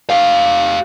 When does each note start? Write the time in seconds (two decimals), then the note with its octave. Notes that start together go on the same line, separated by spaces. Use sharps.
0.10 G4 F5